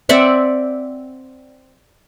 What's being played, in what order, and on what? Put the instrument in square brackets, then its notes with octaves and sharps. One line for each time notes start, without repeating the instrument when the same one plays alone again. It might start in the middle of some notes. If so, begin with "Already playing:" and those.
[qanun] C4 D5 E5 F#5